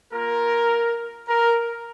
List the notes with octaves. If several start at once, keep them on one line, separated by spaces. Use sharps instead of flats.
A#3 F4 A#4
A#4